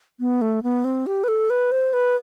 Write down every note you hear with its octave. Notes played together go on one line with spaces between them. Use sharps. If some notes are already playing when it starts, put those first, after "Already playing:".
B3
A3
B3
C4
G4
B4
A4
B4
C5
B4